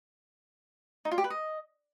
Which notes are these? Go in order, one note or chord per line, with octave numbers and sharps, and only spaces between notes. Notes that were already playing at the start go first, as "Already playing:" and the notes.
D#4
F4
G4
B4
D#5